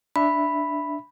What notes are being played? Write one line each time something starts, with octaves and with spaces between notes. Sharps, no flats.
D4 E5 B5